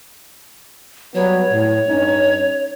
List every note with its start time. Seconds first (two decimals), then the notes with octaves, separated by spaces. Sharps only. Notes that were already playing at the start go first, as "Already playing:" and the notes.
1.15 F#3 G3 B3 C#5
1.52 A2
1.88 G2 C#4 D#4